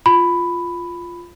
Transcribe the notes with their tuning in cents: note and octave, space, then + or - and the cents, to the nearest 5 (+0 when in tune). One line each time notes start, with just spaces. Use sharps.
F4 +0 B5 +5